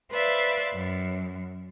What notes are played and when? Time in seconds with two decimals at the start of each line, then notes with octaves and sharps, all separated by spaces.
0.12 B4 C5 D5 E5 F5
0.75 F#2